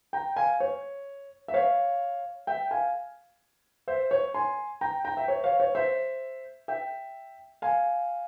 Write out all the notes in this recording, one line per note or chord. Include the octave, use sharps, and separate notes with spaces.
G5 A#5
F5 G#5
C#5
E5
C#5 F5
E5 G5
F5 G#5
C5 E5
C#5
G#5 C6
G5 A#5
G5 A#5
E5
C#5
C#5 F5
C#5
C5 E5
E5 G5
F5 G#5